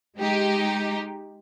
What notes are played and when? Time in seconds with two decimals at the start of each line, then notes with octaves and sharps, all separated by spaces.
0.19 G#3 D#4 G4